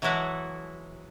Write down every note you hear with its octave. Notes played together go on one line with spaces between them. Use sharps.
E3 F#3 G#3 E4 F#4 A4